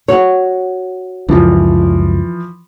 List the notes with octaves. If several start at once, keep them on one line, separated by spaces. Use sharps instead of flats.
F#4 C#5
C#2 F#2 E3 F3